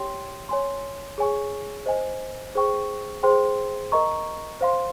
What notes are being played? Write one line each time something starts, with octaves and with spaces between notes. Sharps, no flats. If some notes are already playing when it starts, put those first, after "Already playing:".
Already playing: G4 C#5 G5 C6
C#5 G#5 C6
G#4 C#5 G#5 C#6
C5 D#5 G#5
G#4 C5 G5 C#6
G#4 C5 G5 C6
A#4 D#5 A#5 C#6
C5 F5 C6